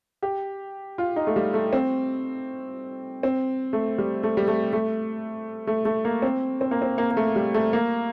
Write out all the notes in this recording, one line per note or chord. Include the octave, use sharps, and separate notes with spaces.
G4
F4
D#4
A3
G3
A3
C4
C4
A3
G3
A3
G3
A3
A3
A3
A3
A#3
C4
C4
A#3
C4
A#3
A#3
A3
G3
A3
A#3